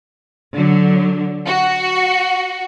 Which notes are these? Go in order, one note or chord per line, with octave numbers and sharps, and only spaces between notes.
D3 F#3
F#4